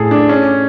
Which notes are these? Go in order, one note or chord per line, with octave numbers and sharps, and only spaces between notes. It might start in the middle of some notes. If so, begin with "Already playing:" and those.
Already playing: A2 G#4 A4
D4
C#4